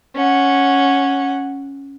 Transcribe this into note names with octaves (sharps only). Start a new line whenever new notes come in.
C#4 F#5